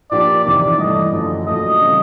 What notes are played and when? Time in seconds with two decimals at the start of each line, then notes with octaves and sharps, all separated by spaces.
0.11 A#2 F3 A#3 D4 G4 D5
0.45 E2 C3 D#3 D5
0.79 G2 E3 A3 D#5
1.13 F#2 D3 F3 A3
1.47 A#2 F#3 A3 D#5
1.82 C#3 E3 G3 C4